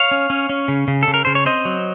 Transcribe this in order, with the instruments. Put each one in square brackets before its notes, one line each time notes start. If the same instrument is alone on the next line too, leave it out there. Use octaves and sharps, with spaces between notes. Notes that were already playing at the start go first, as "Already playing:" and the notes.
Already playing: [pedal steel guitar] C#5 F5
C#4
C#4
C#4
C#3
C#3
A4
C#3
A#4
C#3 C5
C#5
C4 C5 D#5
F#3